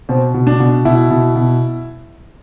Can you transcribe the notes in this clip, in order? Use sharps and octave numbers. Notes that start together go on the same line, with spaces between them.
B2 C4
B2
D4
B2
B2 E4
B2
B2